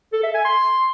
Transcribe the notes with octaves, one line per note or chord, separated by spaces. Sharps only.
A4
E5
G#5
C6